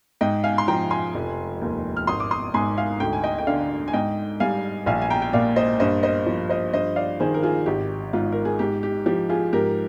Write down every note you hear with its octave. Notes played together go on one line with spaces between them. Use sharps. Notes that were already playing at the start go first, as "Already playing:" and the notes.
G#2 D#5 G5
F5 G#5
C6
F3 G5 A#5
G#5 C6
F1
D#2
F6
G#1 C6 D#6
D6
C6 D#6
G#2 G#5 C6
F5 G#5
D2 G5
G#5
D#5 G5
G5
D3 D5 F5
G#5
G#2 D#5 G5
G3 F5 G#5
A#1 F5 G#5
G#5
G5 A#5
G5
A#2 D5 F5
C5 D#5
G2 C5 D#5
C5 D#5
F3
C5 D#5
G2 C5 D#5
D5 F5
D#3 G#4 C5
A#4
F4 G#4
G#1 G4
G#2 F4
A#4
G#4
G#2 G4
G4
F3 G4
F4 G#4
G#2 G4 A#4